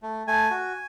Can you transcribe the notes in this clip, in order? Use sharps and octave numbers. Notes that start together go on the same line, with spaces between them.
A3
A3 G#5
F#4